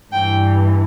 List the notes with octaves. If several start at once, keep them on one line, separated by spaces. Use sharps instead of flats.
G2 E3 G5